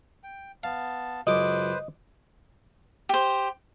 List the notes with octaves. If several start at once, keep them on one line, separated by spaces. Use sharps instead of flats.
G5
B3 F5 A5
C#2 F#2 B4 C5 D#5 D6
G4 C5